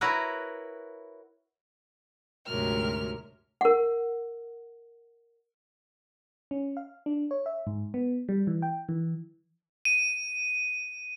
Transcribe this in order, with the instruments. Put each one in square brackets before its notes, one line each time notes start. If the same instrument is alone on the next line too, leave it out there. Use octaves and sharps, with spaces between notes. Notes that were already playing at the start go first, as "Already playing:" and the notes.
[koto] E4 F#4 A#4 B4 C#5 F#5
[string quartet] D2 G#2 C3 F#3 A#4 F6
[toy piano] A#4 F#5
[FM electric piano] C#4
F5
D4
C#5
E5
G#2
B3
G3
E3
G5
E3
[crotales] D#7